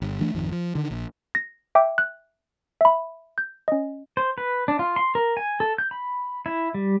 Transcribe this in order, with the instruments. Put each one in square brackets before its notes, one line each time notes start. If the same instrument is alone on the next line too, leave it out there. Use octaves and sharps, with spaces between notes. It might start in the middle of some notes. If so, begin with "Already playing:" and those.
[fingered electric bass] G1
E3 A3 D4
G#1 F2 D#3
F3
D3 D#3
A#1
[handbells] A#6
E5 G5 D6
F#6
E5 B5
G6
C#4 D#5
[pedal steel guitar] C5
B4
D4
F4
C6
A#4
G#5
A4
G6
B5
E4
G3